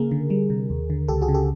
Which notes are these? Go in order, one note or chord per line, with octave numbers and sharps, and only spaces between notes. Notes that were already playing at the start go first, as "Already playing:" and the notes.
Already playing: C#3 A#3 G#4 A#4
D3
G3
C3
D#2
D3
C#2 G4 A4
F#4 G#4
C#3
G4 A4